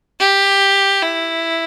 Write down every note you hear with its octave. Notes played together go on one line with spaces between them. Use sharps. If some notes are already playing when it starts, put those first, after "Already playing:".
G4
E4